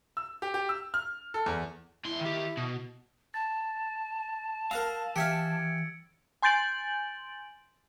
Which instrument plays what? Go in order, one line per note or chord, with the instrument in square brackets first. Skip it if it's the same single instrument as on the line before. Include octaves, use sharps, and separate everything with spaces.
[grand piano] E6
G4
G4
E6
F6
A4
E2
[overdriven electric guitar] E2 C6 [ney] E4
[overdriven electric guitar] D#3 G4
B2
[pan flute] A5 [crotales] A6
[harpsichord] A#4 F#5 A#5 [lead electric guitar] F5 [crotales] E6
[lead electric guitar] E3 [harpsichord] G4 E5 F5 [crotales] G#6 C#7 D7
[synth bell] G#5 C6 G6 A6 D7 F#7